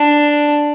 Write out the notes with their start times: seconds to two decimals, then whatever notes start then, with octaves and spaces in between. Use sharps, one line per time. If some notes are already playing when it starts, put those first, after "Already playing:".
Already playing: D4